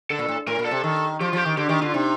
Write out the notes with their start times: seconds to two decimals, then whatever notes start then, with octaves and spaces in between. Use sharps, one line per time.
0.10 D3 A4
0.19 A#2
0.29 A2
0.47 A2 A#4
0.59 A#2
0.65 A4
0.71 C3
0.83 D#3
1.20 F3 G4
1.28 F4
1.33 F3 G4
1.46 D#3
1.57 D3 G4
1.69 D#3 G4
1.82 D3 F4
1.94 C3 D#4